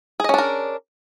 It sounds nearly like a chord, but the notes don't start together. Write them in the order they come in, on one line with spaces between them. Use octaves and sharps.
G#4 D#5 C#4 D4 A#4